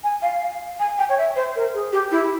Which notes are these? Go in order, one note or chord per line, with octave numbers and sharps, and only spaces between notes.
G#5
F5
F5
G#5
G5
C#5
E5
C5
A#4
G#4
G4
E4